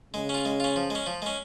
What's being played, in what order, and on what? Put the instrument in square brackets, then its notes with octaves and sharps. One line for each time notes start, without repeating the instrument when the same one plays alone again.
[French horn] C#3 [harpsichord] G#3
[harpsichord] C#4
F4
G#3
C#4 F4
F3
G#3 C#4
F3
G#3 C#4